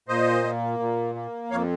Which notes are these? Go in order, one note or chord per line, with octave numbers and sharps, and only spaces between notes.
A#2 C5 D#5
A#3
A#2
A#3
F2 C#5 F5